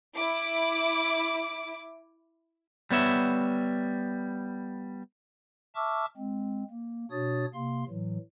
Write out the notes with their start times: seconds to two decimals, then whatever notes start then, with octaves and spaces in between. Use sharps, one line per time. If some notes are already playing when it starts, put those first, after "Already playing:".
0.17 E4 D6
2.91 G3 B3 C#5 E5
5.75 E5 A5 C#6 D6 E6 F6
6.17 G#3 C4
6.70 A#3
7.11 B2 D4 F#4 C#5 D#6 A6
7.54 C3 A#3 F5 C6
7.88 A2 E3 F#3